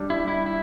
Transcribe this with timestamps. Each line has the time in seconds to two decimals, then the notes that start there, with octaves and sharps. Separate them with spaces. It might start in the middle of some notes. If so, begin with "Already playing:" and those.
Already playing: G3 D4 G4
0.10 E4
0.28 E4
0.46 E4